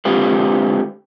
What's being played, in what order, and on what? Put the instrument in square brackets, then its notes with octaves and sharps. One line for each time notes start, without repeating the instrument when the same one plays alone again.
[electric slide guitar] D3 G#3 C4 F4 G4 B4